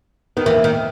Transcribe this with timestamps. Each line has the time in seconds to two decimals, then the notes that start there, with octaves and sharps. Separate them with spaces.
0.37 D#3 B3
0.46 E3 A#3
0.64 D#3